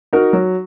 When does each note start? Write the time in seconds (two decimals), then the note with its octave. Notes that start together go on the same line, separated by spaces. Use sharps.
0.13 D#4 F#4 A#4
0.33 F#3